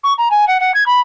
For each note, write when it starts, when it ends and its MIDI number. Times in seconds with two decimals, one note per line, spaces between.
0.04 0.13 85
0.18 0.29 82
0.31 0.45 80
0.48 0.58 78
0.60 0.72 78
0.74 0.84 92
0.86 1.00 83